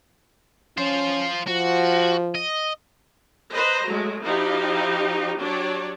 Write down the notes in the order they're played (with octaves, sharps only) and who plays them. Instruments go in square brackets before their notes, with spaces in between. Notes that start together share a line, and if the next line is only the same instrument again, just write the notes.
[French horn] C#4 [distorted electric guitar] F4 C5
[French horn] F3 [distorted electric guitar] F#4
[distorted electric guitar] D#5
[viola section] B4 C5 D#5 A#5
F#3 G#3 A3
F3 D#4 E4 F#4 G4 F5
F#3 D4 G4 C#5 D5